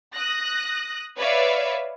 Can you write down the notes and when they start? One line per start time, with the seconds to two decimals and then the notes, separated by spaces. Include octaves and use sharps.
0.13 D#6 F#6 A#6
1.18 B4 C#5 D5 E5 F5